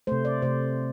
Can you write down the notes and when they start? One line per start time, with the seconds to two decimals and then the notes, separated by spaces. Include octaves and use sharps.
0.07 C3 A3 C5
0.25 D5
0.42 C3 A3 C5